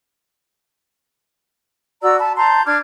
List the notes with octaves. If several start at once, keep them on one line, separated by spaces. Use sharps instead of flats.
F#4 D5 A#5 E6
A5 B5
A5 A#5 C6 G6
D4 D6 F6 G#6